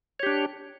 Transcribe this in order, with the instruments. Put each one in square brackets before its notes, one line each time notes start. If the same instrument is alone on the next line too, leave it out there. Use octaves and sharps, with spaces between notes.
[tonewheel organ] C#5
G4
D4